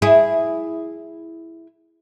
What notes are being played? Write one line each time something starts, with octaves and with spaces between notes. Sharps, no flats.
E4 G#4